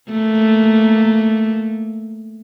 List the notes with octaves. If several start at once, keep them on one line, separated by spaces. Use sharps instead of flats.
A3 A#3